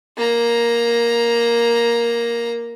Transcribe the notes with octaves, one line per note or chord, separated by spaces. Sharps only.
A#3 A#5